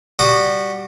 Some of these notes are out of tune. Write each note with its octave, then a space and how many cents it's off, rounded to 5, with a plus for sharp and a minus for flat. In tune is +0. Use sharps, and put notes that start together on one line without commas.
G3 +0 F#4 -5 D#6 -40